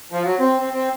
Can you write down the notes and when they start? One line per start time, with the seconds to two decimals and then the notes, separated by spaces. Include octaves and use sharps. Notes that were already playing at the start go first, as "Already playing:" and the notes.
0.12 F3
0.25 F#3
0.40 C4
0.60 C4
0.74 C4